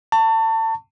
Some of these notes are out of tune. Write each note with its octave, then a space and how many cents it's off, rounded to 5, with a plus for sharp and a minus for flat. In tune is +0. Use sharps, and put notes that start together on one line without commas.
A5 +30 C#6 +20